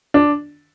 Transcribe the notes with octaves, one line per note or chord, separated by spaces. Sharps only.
D4